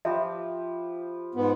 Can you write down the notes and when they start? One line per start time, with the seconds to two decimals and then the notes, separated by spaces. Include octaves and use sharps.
0.05 F3 G4 B4 E5
1.35 G#2 B3